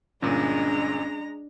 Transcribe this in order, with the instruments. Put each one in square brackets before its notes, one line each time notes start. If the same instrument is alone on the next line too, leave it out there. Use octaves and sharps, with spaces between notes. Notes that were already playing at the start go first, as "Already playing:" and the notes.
[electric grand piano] G1 A#2 [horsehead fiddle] G#3 A#5 [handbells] C#4 [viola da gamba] D4